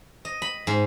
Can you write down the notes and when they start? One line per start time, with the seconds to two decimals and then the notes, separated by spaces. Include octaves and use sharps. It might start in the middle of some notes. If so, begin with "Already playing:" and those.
0.25 D#5
0.42 B5
0.67 G#2